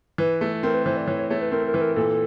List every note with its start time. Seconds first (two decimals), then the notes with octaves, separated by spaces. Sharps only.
0.18 E3 B4
0.41 A3
0.63 C4 A#4
0.74 B4
0.86 E3 C5
0.97 D5
1.08 E3 C#5
1.18 C#5
1.30 A3 C#5
1.41 B4
1.52 C4 A#4
1.68 A#4
1.74 E3 B4
1.81 A#4
1.96 A#2 A4